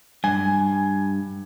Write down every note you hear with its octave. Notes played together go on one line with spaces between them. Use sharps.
G2 G#5